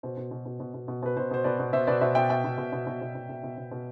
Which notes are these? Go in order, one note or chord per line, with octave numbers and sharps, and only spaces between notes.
B2 C5
B2
B2
B2
B2
B2
B2
B2 B4
B2 C5
B2 C5
B2 B4 D5
B2
B2 C5 E5
B2 B4 D5
B2 C5 E5
B2 E5 G5
B2 E5 G5
B2
B2
B2
B2
B2
B2
B2
B2
B2
B2